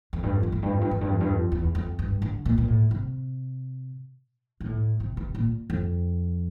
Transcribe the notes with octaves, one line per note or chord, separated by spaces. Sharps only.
F2
G2
F2
G2
F2
G2
F2
G2
F2
G2
F2
G2
F2
E2
F2
G2
D3
A#2
A#2
A2
C3
A#2
A2
C3
C3
A#2
F2